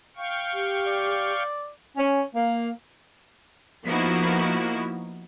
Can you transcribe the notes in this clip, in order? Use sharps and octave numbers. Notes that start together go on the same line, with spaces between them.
F5 G5 C#6
G4
D5
C#4
A#3
F3 A#3 B3 D#4 E4 F#4